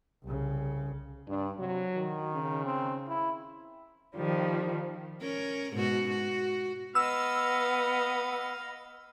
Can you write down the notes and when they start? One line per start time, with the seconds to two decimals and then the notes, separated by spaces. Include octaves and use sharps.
0.24 C2 C#3
1.28 G2 D4
1.59 C3 F#3
1.95 D#3
2.33 C#3
2.66 C4
3.09 E4
4.15 D#3 F3 G3
5.21 C#4 A#4
5.74 G#2 B2 F#4
6.09 F#4
6.95 B3 D#5 F5 E6